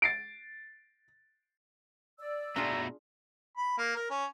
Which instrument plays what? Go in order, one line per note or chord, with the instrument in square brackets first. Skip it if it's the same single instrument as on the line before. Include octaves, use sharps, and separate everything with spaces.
[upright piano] A6 C7 D7
[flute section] D5 E6
[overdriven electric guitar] B2 A3 [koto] D4 F4 G#4 [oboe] A#5
[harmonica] B5
A#3
A#4
C#4